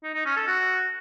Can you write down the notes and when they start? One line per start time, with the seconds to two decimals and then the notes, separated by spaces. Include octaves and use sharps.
0.03 D#4
0.14 D#4
0.25 C#4
0.36 A4
0.47 F#4